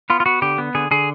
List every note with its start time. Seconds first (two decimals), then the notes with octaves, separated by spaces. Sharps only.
0.10 B3 F4
0.20 F4
0.26 B3 F#4
0.42 D3 G4
0.58 B3
0.75 D3 G#4
0.91 D3 G#4